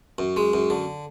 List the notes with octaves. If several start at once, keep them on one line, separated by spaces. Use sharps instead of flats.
F#2
G#3
F#2
D3